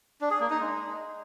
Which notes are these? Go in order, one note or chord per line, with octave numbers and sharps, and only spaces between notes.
D4
G#4
A#3
D#4
G#3